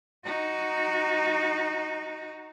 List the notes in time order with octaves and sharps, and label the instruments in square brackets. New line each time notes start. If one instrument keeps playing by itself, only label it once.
[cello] D#4 F#4